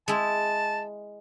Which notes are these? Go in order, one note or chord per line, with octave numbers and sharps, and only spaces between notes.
G#3 E4 A5